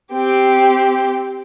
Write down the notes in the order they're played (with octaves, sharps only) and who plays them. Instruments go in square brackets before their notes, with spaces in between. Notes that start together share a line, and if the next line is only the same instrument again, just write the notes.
[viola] C4 G4